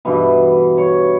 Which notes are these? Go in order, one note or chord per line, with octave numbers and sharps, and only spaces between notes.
G2 B2 E3
C#5